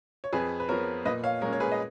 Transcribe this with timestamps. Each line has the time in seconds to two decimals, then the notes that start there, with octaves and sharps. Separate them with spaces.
0.24 C#5
0.33 F2 G#4 B4
0.60 B4
0.69 F3 B3 A#4 C#5
1.05 A#2 B4 D#5
1.23 C#5 F5
1.41 G#3 A#4 C#5
1.46 C#4
1.53 C#5
1.60 G#4 B4
1.71 D#5